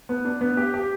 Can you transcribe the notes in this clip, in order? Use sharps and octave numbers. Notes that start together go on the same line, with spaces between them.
B3
D4
B3
G4
G4